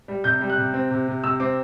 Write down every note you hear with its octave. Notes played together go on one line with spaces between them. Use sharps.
G3
C3 G6
G3
F#6
C3
C4
C3
C3
C3 E6
C4 D6